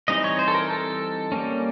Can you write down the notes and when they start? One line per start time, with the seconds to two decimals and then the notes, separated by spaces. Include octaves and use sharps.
0.08 E3 G3 C4 D#4 D#5
0.24 C#5
0.39 C5
0.48 A4
0.55 A#4
0.70 A4
1.32 G3 A#3 C#4